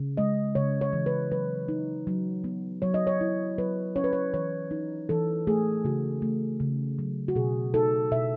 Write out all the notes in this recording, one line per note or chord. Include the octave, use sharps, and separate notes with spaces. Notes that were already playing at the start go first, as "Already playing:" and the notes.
Already playing: C#3
G#3 D#5
C#3 C#5
C#5
E3
B4
F#3 B4
D#4
F#3
B3
F#3 C#5
D#5
C#5
E4
F#3 B4
C#4 C#5
B4
C#5
E3 C#5
D#4
E3 A4
A3 G#4
C#3 F#4
A3
C#3
F#3
F#4
B2 G#4
D#4 A4
B2 E5